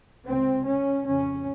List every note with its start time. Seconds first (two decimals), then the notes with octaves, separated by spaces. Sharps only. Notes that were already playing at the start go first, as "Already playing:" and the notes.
0.25 C#2 C3 C4
0.64 C#4
1.04 F2 C#3 C#4